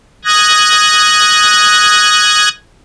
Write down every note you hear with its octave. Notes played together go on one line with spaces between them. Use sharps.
D#6 F#6 G#6 A#6